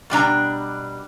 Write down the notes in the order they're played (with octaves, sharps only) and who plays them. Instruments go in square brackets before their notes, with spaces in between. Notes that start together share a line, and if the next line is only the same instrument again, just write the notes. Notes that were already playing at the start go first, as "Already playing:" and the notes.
[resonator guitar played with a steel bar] B2 G3 D4 A#5